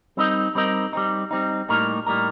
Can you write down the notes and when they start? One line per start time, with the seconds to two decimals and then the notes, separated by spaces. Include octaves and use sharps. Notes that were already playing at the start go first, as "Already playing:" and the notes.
0.17 G3 C4 D#4 A#4 D#5
0.55 G3 C4 D#4 A#4 D#5
0.93 G3 C4 D#4
1.31 G3 C4 D#4
1.69 A2 G3 A#3 D#4 A#4
2.07 A2 G3 A#3 D#4 A#4